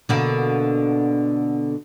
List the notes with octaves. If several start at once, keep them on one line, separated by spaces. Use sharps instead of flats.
B2 D3 A#3